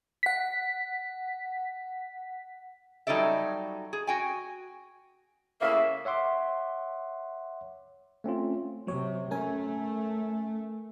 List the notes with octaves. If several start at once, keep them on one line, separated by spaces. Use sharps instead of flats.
F#5 B6
F#3 G3 D#4 A4 D5 E5
G#4
F#4 G5 G#5
A2 C#3 A#3 E5
C#5 E5 F#5 C6 D6
A3 C4 C#4 F4
C3 F#3 C#5
A3 C#4 A#4 G#5